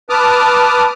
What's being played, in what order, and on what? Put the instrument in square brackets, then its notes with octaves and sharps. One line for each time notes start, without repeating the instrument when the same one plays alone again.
[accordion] B4 A5 D6 D#6 F6